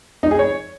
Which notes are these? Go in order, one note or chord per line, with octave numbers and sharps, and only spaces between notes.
D#4
G#4
C#5